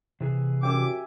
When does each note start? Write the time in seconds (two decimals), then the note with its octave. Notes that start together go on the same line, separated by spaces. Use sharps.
0.21 C3 E3 G#4
0.63 F#2 G4 E5 G#5 D6